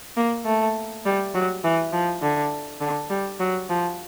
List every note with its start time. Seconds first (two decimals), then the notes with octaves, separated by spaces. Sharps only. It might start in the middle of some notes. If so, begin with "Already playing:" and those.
0.17 A#3
0.46 A3
1.05 G3
1.34 F#3
1.64 E3
1.92 F3
2.22 D3
2.81 D3
3.10 G3
3.40 F#3
3.70 F3